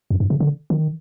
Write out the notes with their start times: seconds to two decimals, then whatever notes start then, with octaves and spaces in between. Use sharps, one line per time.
0.10 F#2
0.20 G2
0.30 C#3
0.40 D3
0.70 D#3